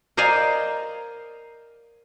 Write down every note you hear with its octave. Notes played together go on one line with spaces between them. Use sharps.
A#4 C5 D5 D#5 F5 G#5